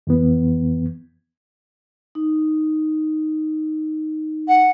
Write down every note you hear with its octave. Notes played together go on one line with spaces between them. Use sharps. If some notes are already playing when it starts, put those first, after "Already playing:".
F2 E3 B3
D#4
F#5